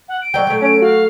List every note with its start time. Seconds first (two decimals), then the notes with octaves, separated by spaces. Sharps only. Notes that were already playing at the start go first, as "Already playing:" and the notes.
0.08 F#5
0.21 D7
0.34 F#3 D5 G5
0.47 F#3 A3
0.61 C#4
0.82 F#4 F5